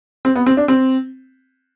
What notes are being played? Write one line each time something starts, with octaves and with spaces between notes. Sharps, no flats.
C4
B3
C4
D4
C4